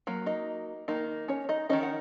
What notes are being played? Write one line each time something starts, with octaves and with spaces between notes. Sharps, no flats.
F#3 A#3
D#4 D#5
D#3 A#3 D#4
C#4 C#5
D#4 D#5
D#3 A#3 C#4 D#4 D#5
F#5